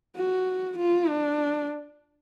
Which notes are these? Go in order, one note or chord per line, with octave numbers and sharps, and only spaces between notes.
F#4
F4
D4